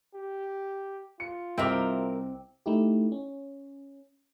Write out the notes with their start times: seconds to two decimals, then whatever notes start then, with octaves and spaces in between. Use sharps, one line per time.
0.14 G4
1.20 F4 C#7
1.58 C2 C4 A#4 D#5 E5 G5 D6
2.66 A3 D#4 E4 G4
3.12 C#4